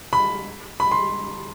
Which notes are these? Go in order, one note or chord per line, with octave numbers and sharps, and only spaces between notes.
B5
B5
C6